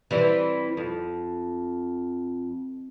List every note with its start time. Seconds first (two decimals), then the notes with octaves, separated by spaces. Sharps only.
0.11 E3 G3 C4
0.77 F2